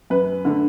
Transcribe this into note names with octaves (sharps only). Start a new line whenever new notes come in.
F#2 B4
D3 A3